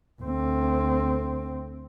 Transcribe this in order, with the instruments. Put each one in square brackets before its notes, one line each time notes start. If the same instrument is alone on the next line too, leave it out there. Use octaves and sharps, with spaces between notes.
[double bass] D2 C4